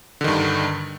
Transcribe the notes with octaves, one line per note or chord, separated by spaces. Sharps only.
G2 D3 D#3